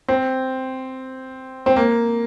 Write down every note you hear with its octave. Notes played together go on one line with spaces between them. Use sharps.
C4
C4
A#3